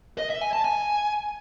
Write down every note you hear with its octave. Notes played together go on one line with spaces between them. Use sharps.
D#5
E5
G#5
A5
G#5